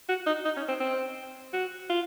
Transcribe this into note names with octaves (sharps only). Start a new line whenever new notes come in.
F#4
D#4
D#4
C#4
C4
C4
F#4
F4